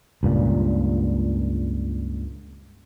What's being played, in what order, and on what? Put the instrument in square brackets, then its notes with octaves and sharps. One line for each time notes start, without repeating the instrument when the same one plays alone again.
[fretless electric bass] C#2 G2 A#2